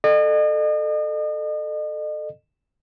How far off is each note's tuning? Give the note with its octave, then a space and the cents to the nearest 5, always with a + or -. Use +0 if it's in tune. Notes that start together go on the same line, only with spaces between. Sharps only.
A4 +0 D#5 -40